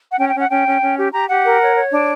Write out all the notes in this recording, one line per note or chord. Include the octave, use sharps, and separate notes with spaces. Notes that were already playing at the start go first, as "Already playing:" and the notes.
F#5
C#4 G5
G5
C#4
F#5
C#4 G5
C#4
C#4
G4
G4 A#5
G4 F#5
A#4
C#5
C#5
D4